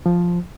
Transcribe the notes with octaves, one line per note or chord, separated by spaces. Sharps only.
F3